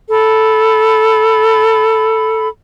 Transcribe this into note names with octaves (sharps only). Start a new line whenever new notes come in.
A4 B5